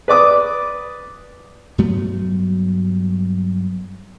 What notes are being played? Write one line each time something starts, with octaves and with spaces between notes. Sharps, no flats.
B4 D5 D6 D#6
G2 F#3 A3 B3